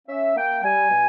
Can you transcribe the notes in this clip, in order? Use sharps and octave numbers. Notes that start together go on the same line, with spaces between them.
C#4 E5
A#3 G5
G3 G#5
B2